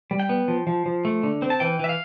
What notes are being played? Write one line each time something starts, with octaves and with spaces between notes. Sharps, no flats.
G3
G5
B3
F3
F3
F3
A3
D3
C4
A5
E3 G5
E3 E5
F5